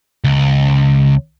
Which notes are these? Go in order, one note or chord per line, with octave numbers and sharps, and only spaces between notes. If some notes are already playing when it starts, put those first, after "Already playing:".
C#2